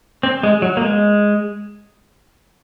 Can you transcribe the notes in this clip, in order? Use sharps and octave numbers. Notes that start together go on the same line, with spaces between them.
C4
G#3
F#3
A#3
G#3